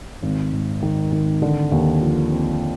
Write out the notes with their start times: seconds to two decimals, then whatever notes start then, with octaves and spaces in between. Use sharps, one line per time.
0.23 G#1
0.52 G#2
0.83 D#3
1.12 D#3
1.42 D3
1.72 D#2
2.02 F3
2.31 C4